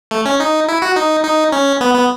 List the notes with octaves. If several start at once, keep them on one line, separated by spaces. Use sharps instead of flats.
A3
C#4
D#4
E4
F#4
D#4
D#4
C#4
B3
B3